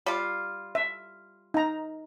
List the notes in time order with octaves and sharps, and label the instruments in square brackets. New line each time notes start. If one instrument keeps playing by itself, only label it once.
[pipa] G3 F4
[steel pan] E5
D#4 A#5